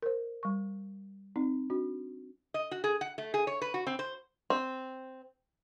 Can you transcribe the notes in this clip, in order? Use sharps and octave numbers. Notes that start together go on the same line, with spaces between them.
A#4 C5
G3 C#6
C4 D#4
D4 F#4
D#5
F#4
G#4
F#5
A3
G#4
C#5
B4
F#4
C4
C5
C4